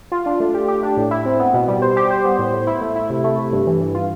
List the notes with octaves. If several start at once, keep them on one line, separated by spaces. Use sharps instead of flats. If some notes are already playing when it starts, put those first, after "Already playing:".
F4
D4
A3
G4
G4
D4
A2
E4
C4
B3
B2
G3
C5
G4
C5
B3
A2
A2
E4
A3
E4
C3
A3
C3
G2
E3
E3
F4